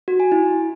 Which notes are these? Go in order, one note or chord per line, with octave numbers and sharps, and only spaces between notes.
F#4
G#5
E4